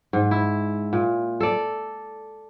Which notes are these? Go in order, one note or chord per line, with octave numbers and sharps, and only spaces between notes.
G#2
E4
A#2
A4 D5